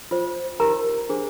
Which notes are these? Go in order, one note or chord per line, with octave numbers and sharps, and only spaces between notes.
F4 C5
D#4 G4 A#4 A#5
D4 G#4 C5